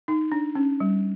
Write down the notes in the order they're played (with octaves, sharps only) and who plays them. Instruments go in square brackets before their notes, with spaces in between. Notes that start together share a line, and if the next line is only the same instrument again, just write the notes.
[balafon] D#4
D4
C#4
G3